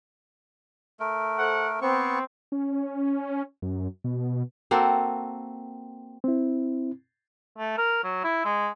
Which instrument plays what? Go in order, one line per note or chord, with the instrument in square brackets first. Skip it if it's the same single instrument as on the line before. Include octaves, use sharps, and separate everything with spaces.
[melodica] A3 A#4
[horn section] A4 C5 F#5
[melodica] B3 C#6 [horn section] C4
[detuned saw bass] C#4
F#2
B2
[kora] A#3 C4 F#4 A4
[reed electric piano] C4 E4
[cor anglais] A3
A#4
F#3
E4
G#3